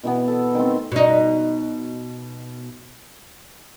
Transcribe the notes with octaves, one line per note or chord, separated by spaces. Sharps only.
B2 E3 B3
A4
D#3 A3 C4
B2 D#4